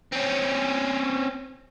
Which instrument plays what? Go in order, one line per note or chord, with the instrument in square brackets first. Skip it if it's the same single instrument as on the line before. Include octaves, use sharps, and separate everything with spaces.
[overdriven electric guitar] C4 C#4